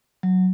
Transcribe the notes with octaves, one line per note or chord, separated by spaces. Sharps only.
F#3